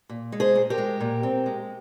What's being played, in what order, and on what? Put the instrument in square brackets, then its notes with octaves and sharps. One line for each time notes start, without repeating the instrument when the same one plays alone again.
[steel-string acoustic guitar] A#2
G#3
G#4 C5
A#2
G4 A#4
G#3
A#2
C4
G#3